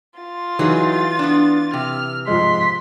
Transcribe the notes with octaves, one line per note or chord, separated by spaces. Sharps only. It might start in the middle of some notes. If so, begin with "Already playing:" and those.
F4 A6
E3 F#3 D#4 G#4
B3 D4
C3 F6
G#2 F3 G#3 C6 B6